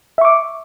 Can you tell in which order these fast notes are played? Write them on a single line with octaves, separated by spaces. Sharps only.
E5 C#6 D6